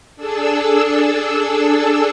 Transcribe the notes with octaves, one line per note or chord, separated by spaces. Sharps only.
D4 G#4 A4 E6